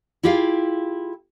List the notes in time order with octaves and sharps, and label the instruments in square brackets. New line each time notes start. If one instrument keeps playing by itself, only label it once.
[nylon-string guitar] E4 F4 G4 G#4 F5